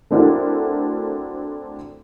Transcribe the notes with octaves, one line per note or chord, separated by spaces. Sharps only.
A3 C4 D4 E4 F#4 A#4